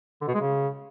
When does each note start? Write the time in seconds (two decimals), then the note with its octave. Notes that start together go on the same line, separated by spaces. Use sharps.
0.21 D3
0.28 B2
0.34 G#3
0.41 C#3